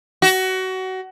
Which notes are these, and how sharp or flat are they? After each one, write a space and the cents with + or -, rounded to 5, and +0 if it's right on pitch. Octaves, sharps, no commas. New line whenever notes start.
F#4 +25